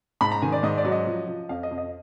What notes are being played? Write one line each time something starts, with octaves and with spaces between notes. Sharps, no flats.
G#2 B5
A#5
D#3 G#5
D5
G#2 D#5
D5
F#3
D#5
F3
F3
F2 F5
D#5
F2
D#5